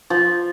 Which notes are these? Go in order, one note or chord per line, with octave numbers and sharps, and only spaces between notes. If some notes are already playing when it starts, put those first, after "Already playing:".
F3